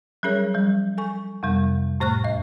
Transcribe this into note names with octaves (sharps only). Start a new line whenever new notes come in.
F#3 G3 C#4 G#4 A#4 C#5
F3 G3
A4 G#5 C#6
F2 C3 G3 B3
A2 A3 C5 C#6 F6 F#6
E2 D#5